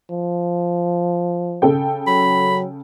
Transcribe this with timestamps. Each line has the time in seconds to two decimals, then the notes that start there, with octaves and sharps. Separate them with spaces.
0.10 F3
1.62 C#3 A4 G5
2.07 F#3 B5